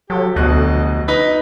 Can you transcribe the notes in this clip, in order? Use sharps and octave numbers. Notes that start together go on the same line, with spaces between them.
F#3 G4 A4
F1 D2 B2 D#5 F#6
D#4 B4